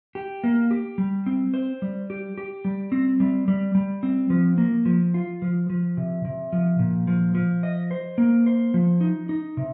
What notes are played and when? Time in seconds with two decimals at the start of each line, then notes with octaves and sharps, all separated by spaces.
0.15 G4
0.44 A#3
0.71 G4
0.98 G3
1.26 C4
1.54 C5
1.82 G3
2.10 G4
2.38 G4
2.65 G3
2.92 C4
3.20 G3
3.48 G3
3.75 G3
4.03 C4
4.30 F3
4.58 A#3
4.85 F3
5.14 F4
5.42 F3
5.70 F3
5.97 C3
6.25 C3
6.52 F3
6.79 A#2
7.07 F3
7.35 F3
7.63 D#5
7.91 C5
8.18 A#3
8.46 C5
8.74 F3
9.01 D#4
9.29 D#4
9.57 C3